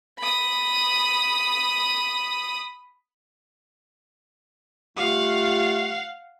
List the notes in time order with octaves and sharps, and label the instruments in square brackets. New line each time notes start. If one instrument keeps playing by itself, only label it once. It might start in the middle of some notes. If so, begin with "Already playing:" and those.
[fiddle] B5 D#6
[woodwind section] G3 A3 F4 [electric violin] F5 F#5